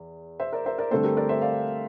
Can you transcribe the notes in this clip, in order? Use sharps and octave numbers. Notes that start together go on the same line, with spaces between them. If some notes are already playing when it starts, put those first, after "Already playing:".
Already playing: E2
C5 E5
A#4 D5
C5 E5
A#4 D5
G2 D3 A3 C4 A4 C5
G4 A#4
A#4 D5
C5 E5
D5 F5